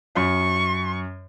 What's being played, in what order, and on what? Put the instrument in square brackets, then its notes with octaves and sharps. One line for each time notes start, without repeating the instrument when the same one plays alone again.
[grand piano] F#2 [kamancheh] C#6